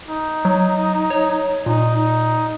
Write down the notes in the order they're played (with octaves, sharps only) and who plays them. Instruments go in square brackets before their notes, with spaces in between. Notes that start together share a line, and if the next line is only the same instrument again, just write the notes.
[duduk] D#4
[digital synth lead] F#3
C#5
[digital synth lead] A#2 [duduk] D#4
[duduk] D#4